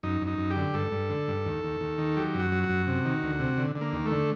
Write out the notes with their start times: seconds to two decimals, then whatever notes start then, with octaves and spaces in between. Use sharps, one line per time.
0.03 F#2 D#4
0.21 F#2
0.27 D#4
0.38 F#2
0.50 G4
0.56 D3
0.74 G2 A4
0.91 G2
1.10 D3
1.28 G2
1.46 D#2
1.63 D#2
1.81 D#2
1.98 D#3
2.16 F#3 G4
2.34 F#2
2.39 F#4
2.52 F#3
2.63 F#4
2.69 F#2
2.87 C3
3.05 D#3
3.23 D2
3.40 C3
3.58 D3
3.75 D3
3.81 A#3
3.93 D#2
4.06 A3
4.11 D3